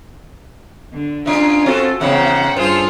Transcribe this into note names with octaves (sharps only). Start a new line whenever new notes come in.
D3
G#2 C#4 D4 F4
C4 F#4 A4
E2 G#2 C#3 C5 F#5 G5
G2 F4 G#4 A4 C5